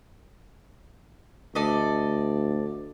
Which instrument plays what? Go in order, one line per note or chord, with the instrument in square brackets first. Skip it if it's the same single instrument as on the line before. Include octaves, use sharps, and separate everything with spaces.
[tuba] D2 [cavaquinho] A4 D5 D#5